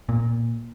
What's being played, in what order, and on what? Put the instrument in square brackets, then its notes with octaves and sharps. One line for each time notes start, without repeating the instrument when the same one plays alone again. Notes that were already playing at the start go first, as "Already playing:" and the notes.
[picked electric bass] A#2